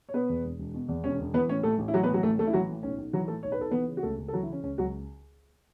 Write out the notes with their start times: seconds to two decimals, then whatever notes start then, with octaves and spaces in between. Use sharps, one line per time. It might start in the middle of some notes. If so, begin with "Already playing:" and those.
0.09 C#5
0.14 B2 B3 B4
0.29 E2
0.44 E1
0.59 E1
0.74 B2
0.88 E2
1.04 E1 C#4 C#5
1.19 E1
1.33 E3 B3 B4
1.48 A2 C#4 C#5
1.63 A1 A3 A4
1.79 A1
1.88 E4
1.94 E3 F#3 F#4
2.03 B3 B4
2.08 A2
2.14 F#3 F#4
2.23 A1 A3 A4
2.38 A1 A3 A4
2.47 E4
2.53 E3 F#3 F#4
2.68 A2
2.83 B1 C#4
2.98 B1
3.13 E3 F#3 F#4
3.28 A2 A3 A4
3.43 B1 C#5
3.52 B4
3.59 B1 A4
3.71 E3 B3 B4
3.88 C#3
3.97 F#4
4.03 C#2 A3 A4
4.18 C#2
4.28 A4
4.33 E3 F#3 F#4
4.43 E4
4.48 C#3 C#4
4.63 C#2 C#4
4.78 C#2 F#3 F#4